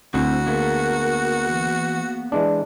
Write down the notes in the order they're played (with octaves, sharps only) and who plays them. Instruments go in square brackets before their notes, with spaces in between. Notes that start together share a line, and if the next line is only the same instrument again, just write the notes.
[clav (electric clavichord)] D2 [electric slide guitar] C4 E4 [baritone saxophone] F#4
[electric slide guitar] A#3 B3 G#4 [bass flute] A#4
[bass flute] E3
[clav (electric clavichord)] E3 G#3 D4 [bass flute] D5